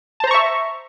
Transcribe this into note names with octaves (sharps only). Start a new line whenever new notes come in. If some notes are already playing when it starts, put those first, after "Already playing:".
C5 E5 A5 A#5 C#6